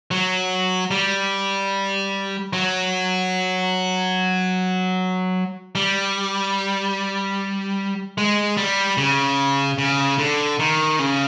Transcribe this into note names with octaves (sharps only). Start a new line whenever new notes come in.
F#3
G3
F#3
G3
G#3
G3
C#3
C#3
D3
D#3
C#3